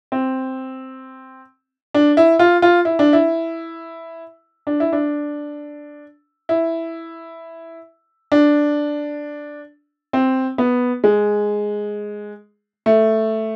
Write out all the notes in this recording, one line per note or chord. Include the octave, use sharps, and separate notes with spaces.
C4
D4
E4
F4
F4
E4
D4
E4
D4
E4
D4
E4
D4
C4
B3
G#3
A3